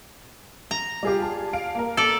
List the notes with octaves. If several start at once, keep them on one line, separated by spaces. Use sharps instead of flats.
A#5
G3 F4 G4 G#4 D5
A5
F5 D7
A#3 A#4
A4 D5